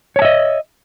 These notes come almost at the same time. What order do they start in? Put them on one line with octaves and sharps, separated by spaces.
C#5 A5 E5 D#5